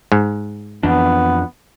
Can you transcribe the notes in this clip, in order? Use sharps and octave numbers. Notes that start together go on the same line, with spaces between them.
G#2
F2 E3 B3 D4